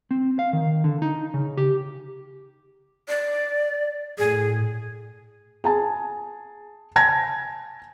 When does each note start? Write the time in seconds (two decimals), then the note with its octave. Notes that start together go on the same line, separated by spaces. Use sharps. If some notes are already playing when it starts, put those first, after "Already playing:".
0.11 C4
0.39 F5
0.53 D#3
0.84 D3
1.02 D#4
1.34 C#3
1.57 G4
3.08 D5
4.18 A2 G#4
5.64 G#4 G#5 A5
6.96 G#5 A5 G#6 A#6